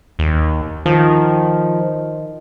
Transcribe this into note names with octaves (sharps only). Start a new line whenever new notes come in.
D#2
D#3 F3